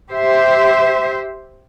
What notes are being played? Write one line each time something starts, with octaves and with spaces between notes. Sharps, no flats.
G4 C5 E5